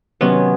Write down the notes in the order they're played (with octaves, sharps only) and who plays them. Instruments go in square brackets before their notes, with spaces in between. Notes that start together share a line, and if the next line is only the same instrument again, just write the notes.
[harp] C3 D#3 F#3 [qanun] B3 C#4